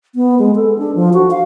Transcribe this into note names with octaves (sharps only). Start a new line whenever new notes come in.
B3
G#3
A4
D4
F3
F#4
F5